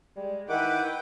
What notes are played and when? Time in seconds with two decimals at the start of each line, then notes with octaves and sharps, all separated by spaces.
0.17 G3 G#3
0.49 D#3 E4 B4 F#5 G5 D6